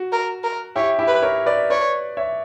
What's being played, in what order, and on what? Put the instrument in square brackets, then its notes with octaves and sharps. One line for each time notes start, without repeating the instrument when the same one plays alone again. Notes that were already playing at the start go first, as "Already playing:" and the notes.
Already playing: [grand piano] F#4
[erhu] A#4
A#4
[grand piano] E4 G4 [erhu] C#5
[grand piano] E4 G4
[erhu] B4
[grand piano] A#4 C#5
B4 D5
[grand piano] B4 D5 [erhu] C#5
[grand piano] C#5 E5